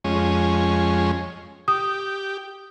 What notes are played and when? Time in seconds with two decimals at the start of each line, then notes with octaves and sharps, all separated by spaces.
0.04 F2 G#3 C#4
1.68 G4 D#6